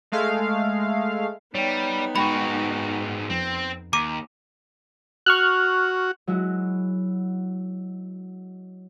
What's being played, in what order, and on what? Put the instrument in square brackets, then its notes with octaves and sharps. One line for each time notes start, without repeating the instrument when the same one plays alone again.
[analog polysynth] G#3 A3 F5
[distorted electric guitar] G3 [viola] B3 D#4 [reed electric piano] C#5 G5
[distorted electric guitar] G#2 F#4 [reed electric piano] G#3 G5 C#6 [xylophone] B5
[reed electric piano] F2 [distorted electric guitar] C4
[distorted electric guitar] D#2 [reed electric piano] A#5 [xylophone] D6 D#7
[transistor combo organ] F#4 [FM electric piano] C#6 F6 F#6
[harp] F#3 G#3 E4 F#4